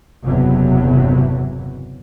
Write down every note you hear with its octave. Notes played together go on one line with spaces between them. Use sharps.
F#1 E2 G2 C3 E3 F#3